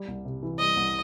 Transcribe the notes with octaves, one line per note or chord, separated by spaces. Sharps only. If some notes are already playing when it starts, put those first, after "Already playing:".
Already playing: G3
C2
C3
E3
G3 D#5
C2